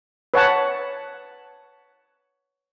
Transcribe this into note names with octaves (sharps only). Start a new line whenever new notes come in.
B4 C#5 F#5 A5